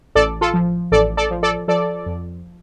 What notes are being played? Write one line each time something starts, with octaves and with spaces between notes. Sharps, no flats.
A1 A4 D5
F4 A4
F3
A1 A4 D5
A4 D5
F3
A4 D5
F3 A4 D5
F2